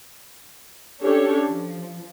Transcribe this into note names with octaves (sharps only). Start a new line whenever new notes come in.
C#4 D4 G4 A4 C#5
F3